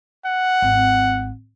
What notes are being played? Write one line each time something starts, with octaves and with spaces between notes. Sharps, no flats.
F#5
G#1 C4